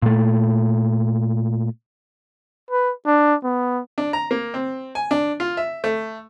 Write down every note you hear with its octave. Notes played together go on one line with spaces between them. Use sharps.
A#2 A3
B4
D4
B3
D4
A#5
A#3
C4
G#5
D4
F4
E5
A3